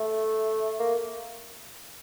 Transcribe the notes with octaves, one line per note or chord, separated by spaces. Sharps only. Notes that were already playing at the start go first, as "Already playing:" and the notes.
Already playing: A3
A#3